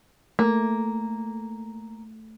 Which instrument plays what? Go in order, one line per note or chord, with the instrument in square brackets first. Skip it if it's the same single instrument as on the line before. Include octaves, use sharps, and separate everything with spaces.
[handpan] A3 [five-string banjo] A#3